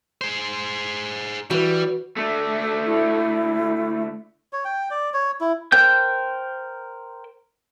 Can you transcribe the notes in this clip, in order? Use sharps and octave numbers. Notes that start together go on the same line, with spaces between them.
G#4 C5
E3 G3 F#4 B4
D3 A3
E4
C#5
G5
D5
C#5
E4
A#4 C5 G5 G6